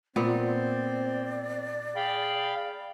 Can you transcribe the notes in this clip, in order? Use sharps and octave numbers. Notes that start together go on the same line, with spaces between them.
A#2 B3 C4 D5
G#4 F5 G5 B5